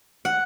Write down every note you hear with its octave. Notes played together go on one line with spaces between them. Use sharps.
F#5